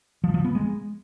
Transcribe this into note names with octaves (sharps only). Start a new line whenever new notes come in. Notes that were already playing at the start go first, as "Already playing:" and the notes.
F3
F3
B3
G#3